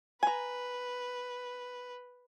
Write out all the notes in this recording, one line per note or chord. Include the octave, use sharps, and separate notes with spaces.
B4 G#5 A#5